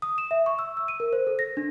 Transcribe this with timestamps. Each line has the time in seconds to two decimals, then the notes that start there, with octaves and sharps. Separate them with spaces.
0.02 D#6
0.18 E7
0.31 E5
0.46 C#6
0.59 E6
0.77 E6
0.88 D#7
1.00 A#4
1.13 C5
1.27 A4
1.39 A#6
1.57 D4